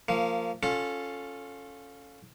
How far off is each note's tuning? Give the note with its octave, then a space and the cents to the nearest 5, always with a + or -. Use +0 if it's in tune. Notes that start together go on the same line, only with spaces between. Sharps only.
F3 -5 A#3 -25
C#4 +0 F4 +20 A4 +0